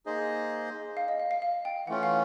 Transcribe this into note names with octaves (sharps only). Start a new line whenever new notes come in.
A#3 D#4 G#4 C5 D#5
F5
D#5
F5
F5
F5
G5
E3 A3 C#4 F4 F#5
F5